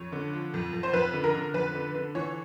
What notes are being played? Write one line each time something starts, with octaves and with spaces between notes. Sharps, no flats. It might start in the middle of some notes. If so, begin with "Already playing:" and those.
Already playing: F2 C#5
D3
F3
F2
F2
C5
F2 B4
D3
A#4
D3
F2 B4
D3
D3
E3 C#5